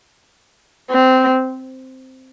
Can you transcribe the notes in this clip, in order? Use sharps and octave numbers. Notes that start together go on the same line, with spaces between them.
C4